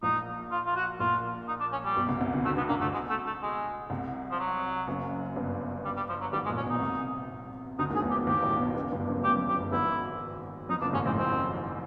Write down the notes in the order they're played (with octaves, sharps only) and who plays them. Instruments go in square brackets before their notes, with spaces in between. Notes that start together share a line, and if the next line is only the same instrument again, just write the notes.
[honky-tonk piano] A#1 A#2 [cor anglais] D#4
[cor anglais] F4
F4
F#4
[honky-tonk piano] A#1 A#2 [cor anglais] F4
[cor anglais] D#4
D4
C#4
G3
[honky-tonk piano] B1 B2
C2 C3
C2 C3
D2 D3
[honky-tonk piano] D2 D3 [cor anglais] A3
[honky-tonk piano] D2 D3 [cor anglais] B3
[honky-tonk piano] D2 D3 [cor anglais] A#3
[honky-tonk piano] D2 D3 [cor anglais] A3
[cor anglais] G#3
A3
A3
G#3
[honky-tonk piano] C2 C3
[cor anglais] F3
F#3
[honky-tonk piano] F#1 F#2
G1 G2
[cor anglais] G3
G3
F3
F#3
[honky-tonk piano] G#1 G#2 [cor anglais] G3
[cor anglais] G#3
[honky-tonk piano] A#1 A#2
[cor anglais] C#4
[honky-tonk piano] B1 B2 [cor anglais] D#4
[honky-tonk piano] C2 C3
[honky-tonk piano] D2 D3 [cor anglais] D#4
[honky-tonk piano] D#2 D#3
[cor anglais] G#4
[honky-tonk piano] E2 E3
[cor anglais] G4
[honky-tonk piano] E2 E3
[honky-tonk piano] D#2 D#3 [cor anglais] G4
[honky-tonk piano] A1 A2
B1 B2
C#2 C#3
G1 G2
F#1 F#2
[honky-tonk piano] E2 [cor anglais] G4
[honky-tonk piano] F2
[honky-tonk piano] F#1 F#2 [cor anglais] G4
[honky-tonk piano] G1 G2
[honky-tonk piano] G#1 G#2 [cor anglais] E4
[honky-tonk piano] F2 [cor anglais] D#4
[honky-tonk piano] F#1 F#2 [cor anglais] D4
[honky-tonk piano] G#1 G#2 [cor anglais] C#4
[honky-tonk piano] A1 A2 [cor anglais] C4
[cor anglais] C4